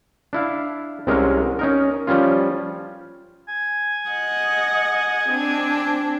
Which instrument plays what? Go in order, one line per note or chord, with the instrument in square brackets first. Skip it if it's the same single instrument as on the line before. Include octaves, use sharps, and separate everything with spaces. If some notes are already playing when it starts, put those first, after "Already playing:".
[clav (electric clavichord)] D4 E4 F5
C2 C3 G#3 C#4 A#4
C#4 D#4 A#4
F3 G3 C#4 F4
[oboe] G#5
[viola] D#5 F#5
C4 D4